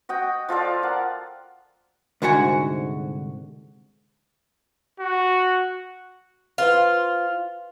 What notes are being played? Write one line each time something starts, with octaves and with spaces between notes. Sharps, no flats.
F#4 D#5 G5
F3 F4 A4 D5
A#4 F#5
C2 G#2 D3 F#4 F#5 G#5
F#4
F4 B4 C5 F5